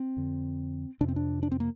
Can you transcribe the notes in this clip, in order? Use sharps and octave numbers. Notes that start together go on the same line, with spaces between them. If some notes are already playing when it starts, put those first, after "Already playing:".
Already playing: C4
F2 D3
F2 C3 D4
C4
D4
D4
C4
A#3